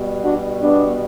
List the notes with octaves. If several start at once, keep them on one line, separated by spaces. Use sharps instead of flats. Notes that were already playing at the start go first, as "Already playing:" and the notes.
Already playing: B2 G3
D4 F#4
B3 D4